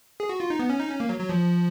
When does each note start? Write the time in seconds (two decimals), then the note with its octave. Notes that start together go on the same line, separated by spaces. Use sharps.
0.20 G#4
0.29 F#4
0.40 F4
0.50 D#4
0.59 B3
0.70 C#4
0.80 D#4
0.89 C#4
1.00 A#3
1.09 F#3
1.20 F#3
1.29 F3